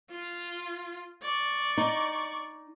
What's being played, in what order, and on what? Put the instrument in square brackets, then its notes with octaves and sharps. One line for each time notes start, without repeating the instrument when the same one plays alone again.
[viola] F4
D5 C#6
[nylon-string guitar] D#4